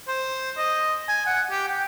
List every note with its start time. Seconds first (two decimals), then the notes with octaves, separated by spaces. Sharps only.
0.08 C5
0.57 D#5
1.08 G#5
1.26 F#5
1.51 G4
1.69 G5